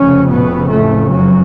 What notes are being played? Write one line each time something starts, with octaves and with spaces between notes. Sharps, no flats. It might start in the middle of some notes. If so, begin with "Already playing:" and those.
Already playing: F1 F2 C#3 C#4
B2 B3
A2 A3
F#2 F#3